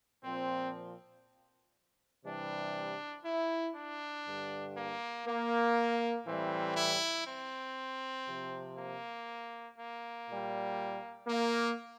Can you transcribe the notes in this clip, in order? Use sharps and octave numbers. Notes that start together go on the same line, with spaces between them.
A#2 F3 C4
C3 E3 G3 D4
E4
D4
G2 D3 G3
A#3
A#3
A2 E3 G3 C4
E4
C4
C3 F3
A#3
A#3
A#2 G3
A#3